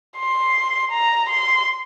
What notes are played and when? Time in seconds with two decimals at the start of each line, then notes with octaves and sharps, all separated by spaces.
0.19 C6
0.92 A#5
1.30 C6